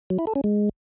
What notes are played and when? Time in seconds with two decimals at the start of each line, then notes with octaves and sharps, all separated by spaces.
0.10 F#3
0.19 E4
0.27 A4
0.35 C#4
0.44 G#3